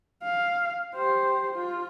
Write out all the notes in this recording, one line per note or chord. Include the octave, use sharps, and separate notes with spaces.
F5
G4 C5
F4